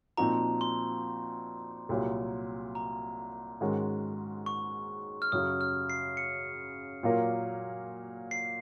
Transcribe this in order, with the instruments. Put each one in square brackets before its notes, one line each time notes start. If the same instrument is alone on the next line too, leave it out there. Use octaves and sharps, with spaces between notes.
[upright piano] A#2 F3 C4 D#4 F#4 [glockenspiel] A#5
[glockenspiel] C6
[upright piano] C2 A#2 F#3
[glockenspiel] A#5
[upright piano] G#2 D#3 G#3 C#4 F#4
[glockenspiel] C#6
F6
[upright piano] F#2 C#3 F#3 [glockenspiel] D#6
[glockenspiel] F6
C7
C#7
[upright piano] A#2 F#3 A#3 F4 A#4
[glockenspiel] C7